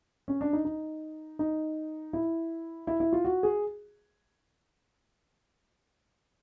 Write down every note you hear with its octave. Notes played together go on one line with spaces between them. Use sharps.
C#4
D4
D#4
D#4
D#4
E4
E4
E4
F4
F#4
G#4